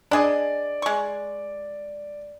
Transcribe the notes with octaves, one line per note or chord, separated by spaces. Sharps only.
D4 G#4 D5 D#5
G#3 C#6